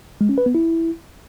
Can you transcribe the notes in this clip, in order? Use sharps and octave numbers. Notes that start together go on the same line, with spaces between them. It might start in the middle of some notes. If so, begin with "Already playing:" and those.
G#3
C#4
B4
B3
E4